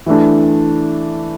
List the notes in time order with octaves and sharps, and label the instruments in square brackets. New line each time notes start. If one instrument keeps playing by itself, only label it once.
[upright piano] E3 A3 D4